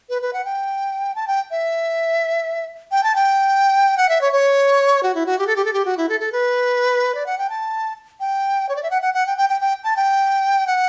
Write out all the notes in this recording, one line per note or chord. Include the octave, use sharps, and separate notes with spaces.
B4
B4
F#5
G5
A5
G5
E5
G5
A5
G5
F#5
E5
C#5
C#5
F#4
E4
F#4
G4
A4
G4
A4
G4
F#4
E4
A4
A4
B4
D5
F#5
G5
A5
G5
C#5
D5
E5
F#5
F#5
F#5
G5
G5
G5
G5
A5
G5
F#5